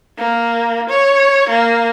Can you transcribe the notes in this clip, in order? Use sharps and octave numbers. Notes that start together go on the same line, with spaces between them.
A#3
C#5
A#3